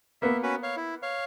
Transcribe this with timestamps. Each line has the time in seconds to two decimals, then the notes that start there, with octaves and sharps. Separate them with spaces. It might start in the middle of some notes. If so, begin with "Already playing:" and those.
0.22 A#3 B3 E5
0.43 C#4 F#4 B4
0.63 C#5 F5
0.77 E4
1.03 C#5 F5